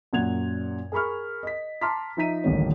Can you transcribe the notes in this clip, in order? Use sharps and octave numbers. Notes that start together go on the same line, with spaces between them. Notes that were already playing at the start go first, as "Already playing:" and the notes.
F#2 A#2 F#5 G#6 F7
G#4 A#4 B5 C#6 F6
D#5 B6
A5 A#5 C6 D6 F6 B6
F3 D#4 E5 A#5 B6 D#7
D#1 A1 D#2 D3 A#3 C#5